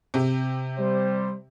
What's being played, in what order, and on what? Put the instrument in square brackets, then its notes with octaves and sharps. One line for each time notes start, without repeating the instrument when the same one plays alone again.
[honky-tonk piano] C3 G4
[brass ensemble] G3 C5